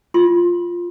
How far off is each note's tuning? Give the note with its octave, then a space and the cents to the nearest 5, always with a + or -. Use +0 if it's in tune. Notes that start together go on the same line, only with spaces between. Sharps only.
F4 +0 C6 +20